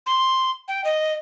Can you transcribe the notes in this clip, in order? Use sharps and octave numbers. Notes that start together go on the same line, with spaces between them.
C6
G5
D#5